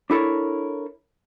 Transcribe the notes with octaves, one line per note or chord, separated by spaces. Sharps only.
D4 E4 A4 A#4 C#5